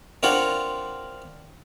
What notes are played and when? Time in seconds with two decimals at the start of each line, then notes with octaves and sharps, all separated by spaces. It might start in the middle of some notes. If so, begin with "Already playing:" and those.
0.23 C4 D4 F4 A#4 C#5 F#5